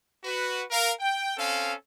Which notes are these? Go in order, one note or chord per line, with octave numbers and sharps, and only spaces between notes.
F#4 B4
A#4 F5
G5
C4 C#4 A4 F5